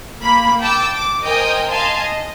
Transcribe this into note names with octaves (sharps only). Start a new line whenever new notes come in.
A#3 B5
G5 A5 D6 E6
D6
A#4 C5 D#5 G5 G#5 D#6
D#5 F5 G#5 A5 C6
D#5